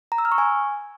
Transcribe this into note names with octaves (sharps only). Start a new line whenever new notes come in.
A#5
E6
F6
C#6
G#5